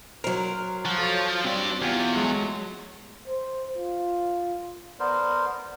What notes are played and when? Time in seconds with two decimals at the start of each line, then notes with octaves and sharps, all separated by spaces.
0.24 F#3 A#4 C5
0.85 F3 F#4
0.98 A4 C#5
1.44 G2 C4 D5
1.82 E2 F4 G4
2.15 F#3 G#3 A3
3.27 C5
3.76 F4
5.00 B3 A#4 C5 D5